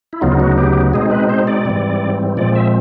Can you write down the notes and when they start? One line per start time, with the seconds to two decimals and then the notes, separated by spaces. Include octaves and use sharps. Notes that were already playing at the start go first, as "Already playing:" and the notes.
0.13 E4
0.21 D2 C#3 F#3 B3 D#4 F4
0.40 F#4
0.57 G4
0.93 B2 G#3 C4 D#4 G#4
1.11 B4
1.29 C5
1.47 D5
1.65 G#2 E3 G3 C4
2.37 A#2 F3 G#3 C4 D5
2.55 E5